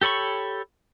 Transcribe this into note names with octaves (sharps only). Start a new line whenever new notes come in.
G4 A4 C#5 B5 C#6